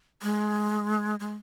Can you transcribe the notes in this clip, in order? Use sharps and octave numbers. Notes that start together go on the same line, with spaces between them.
G#3
G#3